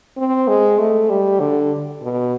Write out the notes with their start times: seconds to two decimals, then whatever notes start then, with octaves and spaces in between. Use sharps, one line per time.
0.17 C4
0.48 G#3
0.79 A3
1.10 G3
1.40 D3
2.02 B2